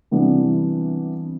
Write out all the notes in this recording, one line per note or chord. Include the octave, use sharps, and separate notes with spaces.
C3 E3 G3 B3 D4